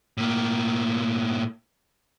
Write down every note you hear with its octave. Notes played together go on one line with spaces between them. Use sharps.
A2 A#3